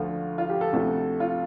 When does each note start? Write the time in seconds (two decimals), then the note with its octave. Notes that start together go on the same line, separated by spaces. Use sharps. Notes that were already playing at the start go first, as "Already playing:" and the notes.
Already playing: D2 D3 F3 A3 F4
0.38 F4
0.50 G4
0.61 A4
0.73 D2 C3 F3 A3
1.20 F4